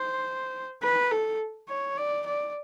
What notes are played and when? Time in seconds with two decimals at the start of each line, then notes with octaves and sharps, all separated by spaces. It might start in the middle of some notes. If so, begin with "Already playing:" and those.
Already playing: C5
0.83 B4
1.11 A4
1.69 C#5
1.98 D5
2.26 D5